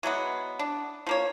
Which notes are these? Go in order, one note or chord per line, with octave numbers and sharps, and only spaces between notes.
E3 F#3 G#3 B3
D4
F3 A#3 C#5